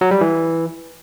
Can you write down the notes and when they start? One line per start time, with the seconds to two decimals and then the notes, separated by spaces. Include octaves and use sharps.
0.01 F#3
0.11 G3
0.21 E3